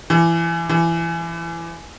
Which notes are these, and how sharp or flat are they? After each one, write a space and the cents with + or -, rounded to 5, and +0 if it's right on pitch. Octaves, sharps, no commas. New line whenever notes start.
E3 +25
E3 +25